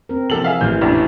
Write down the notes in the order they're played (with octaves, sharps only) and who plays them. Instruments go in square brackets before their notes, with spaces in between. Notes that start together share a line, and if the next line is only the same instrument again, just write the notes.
[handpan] C4 A#4
[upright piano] C3 A4 F#7 [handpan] E3 F3
[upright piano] G#4 E5 F5
[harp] A1 [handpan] A3 [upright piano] F6 G6
[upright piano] A#1 F2 C3 [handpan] B3 C#4 D4